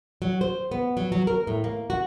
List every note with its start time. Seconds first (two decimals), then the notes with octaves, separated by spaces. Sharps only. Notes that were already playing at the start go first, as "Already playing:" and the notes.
0.22 F#3
0.41 C5
0.71 B3
0.97 F#3
1.12 F#3
1.27 A#4
1.47 A2
1.64 A#3
1.90 F#4